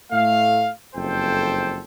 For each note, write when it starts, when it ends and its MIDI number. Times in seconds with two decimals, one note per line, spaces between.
0.12 0.71 45
0.12 0.71 57
0.12 0.71 77
0.95 1.82 30
0.95 1.82 41
0.95 1.82 69
0.95 1.82 72
0.95 1.82 79